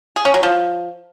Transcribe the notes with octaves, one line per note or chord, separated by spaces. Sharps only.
G#4
C#4
F#3
F3